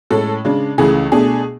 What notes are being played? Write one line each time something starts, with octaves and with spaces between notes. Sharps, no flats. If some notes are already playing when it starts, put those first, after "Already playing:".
A2 G#3 C#4 A4
C#3 G#3 D4
C#2 C#3 E3 A3 G#4
B2 A3 D4 G#4